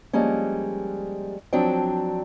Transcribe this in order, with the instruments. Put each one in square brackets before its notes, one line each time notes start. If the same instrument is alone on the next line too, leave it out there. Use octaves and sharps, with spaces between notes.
[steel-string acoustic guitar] F3 G3 G#3 A#3 C#4
F3 F#3 C4 D4 G5